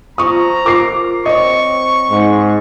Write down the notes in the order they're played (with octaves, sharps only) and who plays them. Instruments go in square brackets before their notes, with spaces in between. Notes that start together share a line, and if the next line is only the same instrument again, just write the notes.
[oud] F3 F4 [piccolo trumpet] A#5 [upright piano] C#6 D#6
[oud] A#4 [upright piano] D6 C7
[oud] C4 C#5 [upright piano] D#5 [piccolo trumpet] C#6
[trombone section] G#2